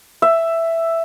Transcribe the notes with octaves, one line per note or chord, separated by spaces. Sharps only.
E5